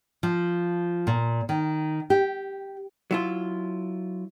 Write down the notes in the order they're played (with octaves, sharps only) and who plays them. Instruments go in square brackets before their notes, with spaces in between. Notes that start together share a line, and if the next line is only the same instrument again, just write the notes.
[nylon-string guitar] F3
A#2
D#3
G4
[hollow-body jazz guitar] F#3 E4 F4